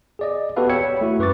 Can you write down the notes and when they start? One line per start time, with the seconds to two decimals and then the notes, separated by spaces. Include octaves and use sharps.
0.19 G#4 D5 D#5
0.56 B3 F#4 G4 A4 B4 F5
0.69 C#5 G5 B5 E6 G#6 C#7
1.01 A3 E4 F#4
1.19 F#2 B4 C#6 D6 A6